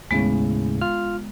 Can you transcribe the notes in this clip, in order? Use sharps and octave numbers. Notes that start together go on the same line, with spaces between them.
D#2 A2 C#3 G#3 B3
F4 F6